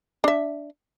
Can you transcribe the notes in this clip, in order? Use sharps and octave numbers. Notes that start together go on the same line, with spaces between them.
D4 E5